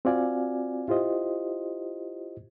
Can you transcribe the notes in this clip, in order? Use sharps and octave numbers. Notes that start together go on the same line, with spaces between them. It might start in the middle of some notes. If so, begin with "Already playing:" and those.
C4 F4 F#4 D5 F5 G#5
E4 F4 G4 C5 D#5